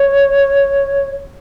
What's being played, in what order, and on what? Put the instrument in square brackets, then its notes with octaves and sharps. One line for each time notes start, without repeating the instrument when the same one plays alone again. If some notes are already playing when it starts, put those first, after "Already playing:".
Already playing: [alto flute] C#5